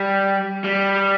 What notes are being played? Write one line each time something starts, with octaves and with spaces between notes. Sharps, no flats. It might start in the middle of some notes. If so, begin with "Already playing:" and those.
Already playing: G3
G3